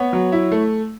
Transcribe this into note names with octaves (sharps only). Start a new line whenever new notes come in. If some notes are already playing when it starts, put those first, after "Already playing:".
Already playing: B3 C#5
F#3
E4
A3